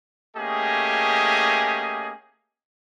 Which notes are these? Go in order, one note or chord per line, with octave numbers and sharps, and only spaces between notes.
A3 A#3 C#4 G4 G#4 D#5